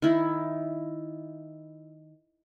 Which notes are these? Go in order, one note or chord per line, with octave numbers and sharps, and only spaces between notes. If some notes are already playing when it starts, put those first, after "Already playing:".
D#3 E4